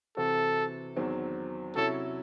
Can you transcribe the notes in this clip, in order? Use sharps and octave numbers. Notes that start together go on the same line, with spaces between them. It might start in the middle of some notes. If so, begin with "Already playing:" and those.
C3 E3 C4 F#4 A4
E2 D#3 F#3 C4
C3 F#3 C#4 E4 A4